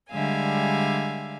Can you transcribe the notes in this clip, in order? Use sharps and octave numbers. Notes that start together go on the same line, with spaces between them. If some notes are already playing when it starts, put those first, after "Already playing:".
D3 G3 G#3 E5 F5 G#5